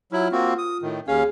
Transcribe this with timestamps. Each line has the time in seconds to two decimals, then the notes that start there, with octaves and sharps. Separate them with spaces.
0.12 F#3 E4 F4
0.32 A#3 C4 F#4
0.58 D#6
0.82 A2 D#3
1.08 D#2 C#4 G#4 F5